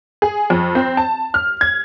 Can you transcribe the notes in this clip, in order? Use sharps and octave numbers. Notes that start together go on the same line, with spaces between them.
G#4
F2
C4
A5
F6
G#6